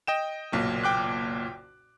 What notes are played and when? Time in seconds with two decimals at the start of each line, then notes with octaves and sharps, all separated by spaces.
0.07 D#5 G5 E7
0.52 F#1 B1 A#2
0.84 G5 D6 F#6